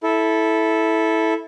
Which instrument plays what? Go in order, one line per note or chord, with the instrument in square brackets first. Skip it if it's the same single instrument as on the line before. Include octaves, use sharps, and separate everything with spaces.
[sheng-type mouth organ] E4 A4